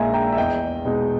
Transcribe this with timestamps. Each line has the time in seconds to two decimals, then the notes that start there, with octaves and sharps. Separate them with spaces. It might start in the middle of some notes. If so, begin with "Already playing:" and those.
Already playing: A#1 A#2 G#3 D#4 E5 G#5 A#5
0.13 G5 A#5
0.32 E5
0.37 E2 D#5 G5
0.85 B2 G#3 D#4